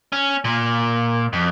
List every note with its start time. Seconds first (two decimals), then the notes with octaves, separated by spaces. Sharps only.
0.12 C#4
0.45 A#2
1.33 F2